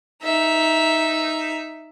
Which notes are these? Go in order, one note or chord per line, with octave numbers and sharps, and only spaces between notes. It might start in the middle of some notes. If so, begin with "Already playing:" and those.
D#4 E5